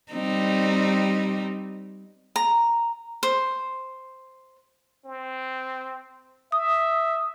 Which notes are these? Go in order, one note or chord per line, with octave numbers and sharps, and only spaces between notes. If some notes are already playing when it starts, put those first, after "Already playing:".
G3 C4 D#4
A#5
C5
C4
E5 D#6